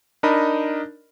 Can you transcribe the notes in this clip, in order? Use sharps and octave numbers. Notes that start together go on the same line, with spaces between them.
D4 D#4 A#4 D#5 B5